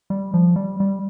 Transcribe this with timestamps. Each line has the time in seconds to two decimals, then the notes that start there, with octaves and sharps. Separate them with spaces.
0.10 G3
0.34 F3
0.56 G3
0.80 G3